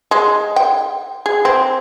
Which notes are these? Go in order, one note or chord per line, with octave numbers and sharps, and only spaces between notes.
G#3
G5
G#4
C4